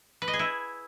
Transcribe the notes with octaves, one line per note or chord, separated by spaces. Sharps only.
B4
D#5
G#4
E4